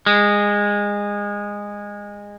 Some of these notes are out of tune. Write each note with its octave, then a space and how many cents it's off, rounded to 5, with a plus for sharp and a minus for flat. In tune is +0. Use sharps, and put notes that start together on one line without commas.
G#3 -20